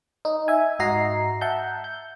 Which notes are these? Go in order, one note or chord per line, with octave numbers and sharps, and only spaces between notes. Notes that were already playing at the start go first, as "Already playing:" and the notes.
D#4
E5 G#5
G#2 F#4 D#5 A#5 C7
E5 F#5 A5 G6
G6